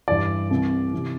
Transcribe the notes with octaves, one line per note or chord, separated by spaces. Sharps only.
G2 E3 D5
C2 C3 E3
C3 E3